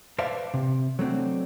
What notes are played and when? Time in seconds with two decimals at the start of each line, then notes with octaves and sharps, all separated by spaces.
0.18 B4 C5 D5 E5 F5 A5
0.54 C3
0.99 F#3 A3 C4 D4